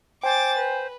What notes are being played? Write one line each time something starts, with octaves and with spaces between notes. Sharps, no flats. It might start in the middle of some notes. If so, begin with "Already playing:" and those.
C5 G5 G#5 D6 A6
B4